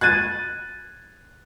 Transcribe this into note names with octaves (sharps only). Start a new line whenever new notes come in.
F#6 G#6 A6 D#7